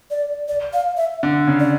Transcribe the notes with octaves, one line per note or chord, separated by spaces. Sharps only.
D5
D5
F5
E5
D3
C#3
D5